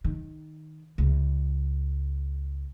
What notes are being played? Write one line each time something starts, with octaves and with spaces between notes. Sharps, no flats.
D#3
C#2